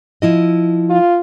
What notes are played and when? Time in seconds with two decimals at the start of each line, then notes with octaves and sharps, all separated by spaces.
0.22 F3 E4 D#5
0.90 F4